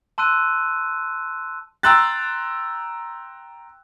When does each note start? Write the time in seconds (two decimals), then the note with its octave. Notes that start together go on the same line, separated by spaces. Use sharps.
0.18 A5 C6 E6 F#6 D#7
1.83 G5 A#5 C6 E6 F#6 A6